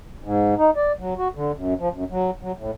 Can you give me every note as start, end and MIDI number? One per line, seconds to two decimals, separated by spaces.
0.24 0.54 44
0.58 0.70 63
0.76 0.92 74
0.99 1.14 54
1.18 1.28 66
1.35 1.52 50
1.55 1.74 42
1.80 1.89 53
1.93 2.04 42
2.10 2.31 54
2.42 2.52 54
2.58 2.71 45